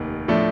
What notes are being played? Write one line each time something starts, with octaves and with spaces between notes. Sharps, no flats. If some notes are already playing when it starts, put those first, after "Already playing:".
Already playing: F1 D#2 D#3
A2 F3 A3 D4